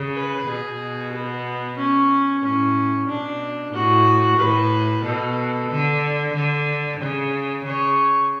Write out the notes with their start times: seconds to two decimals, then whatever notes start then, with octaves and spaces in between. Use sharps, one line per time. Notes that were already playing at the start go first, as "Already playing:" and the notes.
Already playing: C#3
0.15 B4
0.47 B2 G#4
1.12 B3
1.77 C#4
2.43 A2 C#4
3.09 B2 D4
3.73 A2 F#4
4.39 A2 B4
5.04 B2 A4
5.70 D3
6.35 D3
7.01 C#3
7.66 C#3 C#5